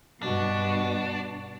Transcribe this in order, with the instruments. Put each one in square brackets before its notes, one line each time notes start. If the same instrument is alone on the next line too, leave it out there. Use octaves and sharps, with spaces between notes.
[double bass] G2 [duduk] B2 [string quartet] B3 F#4 [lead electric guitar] D4